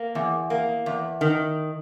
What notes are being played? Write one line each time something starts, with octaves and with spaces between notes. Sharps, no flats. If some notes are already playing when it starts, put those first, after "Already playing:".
Already playing: A#3
E2
A#3
E2
D#3